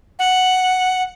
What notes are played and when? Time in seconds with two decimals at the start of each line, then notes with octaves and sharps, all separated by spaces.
0.19 F#5